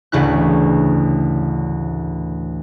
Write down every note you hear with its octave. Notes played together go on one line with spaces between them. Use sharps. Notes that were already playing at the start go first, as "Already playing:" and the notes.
A1 D2 C#3 E4 F#6